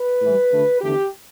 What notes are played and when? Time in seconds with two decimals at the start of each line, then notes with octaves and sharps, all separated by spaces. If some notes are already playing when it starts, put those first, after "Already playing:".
Already playing: B4
0.22 A2 E3 G3
0.52 D2 D3 A3
0.81 E2 D3 A3 G4